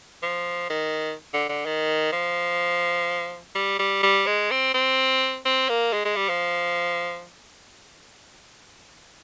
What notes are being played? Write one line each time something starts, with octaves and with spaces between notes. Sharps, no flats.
F3
D#3
D3
D3
D#3
F3
G3
G3
G3
G#3
C4
C4
C4
A#3
G#3
G#3
G3
F3